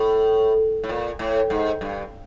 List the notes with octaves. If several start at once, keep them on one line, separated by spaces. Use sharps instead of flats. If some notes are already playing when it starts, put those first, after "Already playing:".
Already playing: A2
A2
A#2
A2
G#2
G2